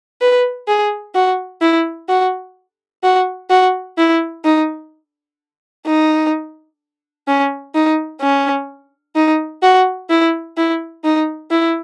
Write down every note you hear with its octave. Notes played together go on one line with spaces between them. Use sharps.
B4
G#4
F#4
E4
F#4
F#4
F#4
E4
D#4
D#4
C#4
D#4
C#4
D#4
F#4
E4
E4
D#4
E4